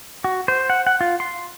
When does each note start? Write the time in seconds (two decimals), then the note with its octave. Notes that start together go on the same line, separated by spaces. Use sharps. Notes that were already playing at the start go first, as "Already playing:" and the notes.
0.24 F#4
0.48 C5
0.70 F#5
0.87 F#5
1.01 F4
1.20 C6